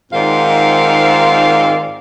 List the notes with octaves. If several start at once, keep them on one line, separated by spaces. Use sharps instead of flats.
G#2 D#3 C4 F4 D5 F5